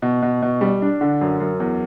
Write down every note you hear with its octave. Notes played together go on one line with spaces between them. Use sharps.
B2
B2
B2
G3
D4
D3
F#2
F#2
E2